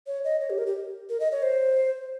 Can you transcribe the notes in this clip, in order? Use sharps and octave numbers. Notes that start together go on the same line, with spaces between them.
C#5
D#5
C#5
G4
A#4
G4
A#4
D#5
C#5
C5